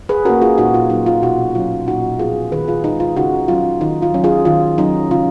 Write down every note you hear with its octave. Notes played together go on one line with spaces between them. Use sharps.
G#4 B4
A#3 C#4 F#4 A#4
F4 G#4
A#2 D#4 F#4
F4
F#3 A#3 C#4 D#4
F4
B2 D#4 F#4
F#3 C#4 F4
A#2 D#4 F#4
F3 B3 D#4 F4 G#4
D#3 G#4 B4
F4 G#4
G#3 D#4
F4
C#3 D#4 F#4
F#3 C#4 F4
D#3 D#4
F4
F#3 C#4
F4 G#4
D#3 F4
F#3 C#4 D#4
C#3 F4